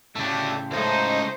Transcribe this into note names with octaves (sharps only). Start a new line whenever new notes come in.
A2 C#3 A3 D4 G4
C#2 A3 D#4 C5